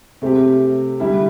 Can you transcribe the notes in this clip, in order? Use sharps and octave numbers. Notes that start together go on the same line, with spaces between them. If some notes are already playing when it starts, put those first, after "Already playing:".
C3 A3 C4 G4
D3 G3 E4 G4